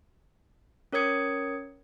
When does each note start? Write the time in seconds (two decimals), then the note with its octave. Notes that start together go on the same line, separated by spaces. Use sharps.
0.92 C#4 A#4 C#5 D#6 G#6 C#7